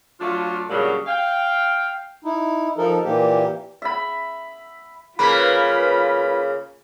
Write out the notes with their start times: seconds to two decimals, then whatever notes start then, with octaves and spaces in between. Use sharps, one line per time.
0.20 F#3 A3 D4 F4
0.69 A#2 C#3 F#3 G3 D4 F#4
1.07 F5 G5
2.24 D#4 E4
2.77 F3 D#4 A4 A#4
3.04 A#2 E3 A#3 G4
3.82 E5 B5
5.19 C#3 A#3 F4 B4 B5 B6